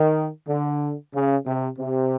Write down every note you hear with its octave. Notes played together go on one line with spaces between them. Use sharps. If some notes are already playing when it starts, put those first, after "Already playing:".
Already playing: D#3
D3
C#3
C3
C3